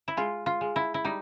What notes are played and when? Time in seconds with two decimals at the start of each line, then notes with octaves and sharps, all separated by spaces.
0.08 E4
0.17 G#3 F4
0.46 F4
0.61 G#3
0.76 E4
0.94 E4
1.04 G3 D#4